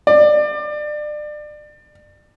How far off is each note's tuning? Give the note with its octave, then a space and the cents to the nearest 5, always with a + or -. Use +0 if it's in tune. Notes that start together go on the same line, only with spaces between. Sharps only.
D5 +30